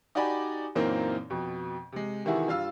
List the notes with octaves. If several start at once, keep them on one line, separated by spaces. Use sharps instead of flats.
D#4 F#4 G4 D5 G#5 B5
F#2 A#2 E3 A#3 C4 D#4
F2 B2
C3 G#3
C3 D#3 E3 E4 F#4 G#4
G2 F4 F5 E6